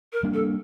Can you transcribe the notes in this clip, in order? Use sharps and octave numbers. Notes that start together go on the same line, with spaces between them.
A#4
G3 A#3 D4
A4